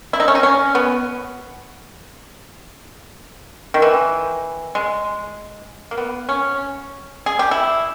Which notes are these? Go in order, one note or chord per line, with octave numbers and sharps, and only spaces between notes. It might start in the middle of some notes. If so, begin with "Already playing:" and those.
E4
D#4
C#4
D#4
C#4
B3
D#3
E3
G#3
A#3
B3
C#4
G#4
G4
E4